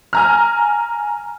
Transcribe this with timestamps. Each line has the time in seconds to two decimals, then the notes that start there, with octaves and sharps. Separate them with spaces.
0.13 G#5 A#5 F6